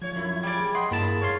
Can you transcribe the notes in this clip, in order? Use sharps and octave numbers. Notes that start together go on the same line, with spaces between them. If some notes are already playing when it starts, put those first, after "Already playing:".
F2 D3 F3 C#5 G#6
F#2 E4
G3 G#4 D5
D#5 F#5 G5 C6
G2 A#3 E4 A5
C#5 F5 C6